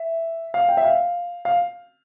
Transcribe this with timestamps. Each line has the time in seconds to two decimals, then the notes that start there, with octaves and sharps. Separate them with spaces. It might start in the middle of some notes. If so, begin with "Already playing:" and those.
Already playing: E5
0.54 F5
0.69 G5
0.77 E5
0.84 F5
1.45 F5